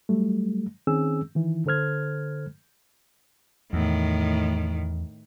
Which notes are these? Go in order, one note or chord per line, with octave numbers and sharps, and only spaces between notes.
F#3 G3 A3
D#3 C4 C#4 G#4 E6
D#3 E3 E4
D3 A4 C5 F6 G#6
E2 A2 D#3